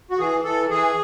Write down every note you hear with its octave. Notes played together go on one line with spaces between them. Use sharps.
F#4
E3 G#4
E3 A4
E3 G#4